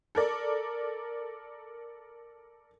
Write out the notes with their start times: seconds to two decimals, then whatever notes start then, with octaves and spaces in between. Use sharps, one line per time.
0.15 A4 A#4 D5